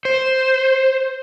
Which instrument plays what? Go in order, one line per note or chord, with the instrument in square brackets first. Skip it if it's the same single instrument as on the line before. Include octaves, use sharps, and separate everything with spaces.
[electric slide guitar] C5